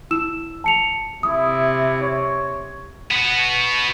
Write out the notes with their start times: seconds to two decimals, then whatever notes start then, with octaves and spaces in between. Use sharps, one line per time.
0.11 E4 E6 E7
0.64 A5 C#7 F7
1.23 C3 E4 D#6
2.02 C#5
3.11 B3 F#4